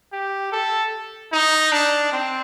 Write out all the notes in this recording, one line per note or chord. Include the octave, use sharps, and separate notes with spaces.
G4
A4
D#4
D4
C4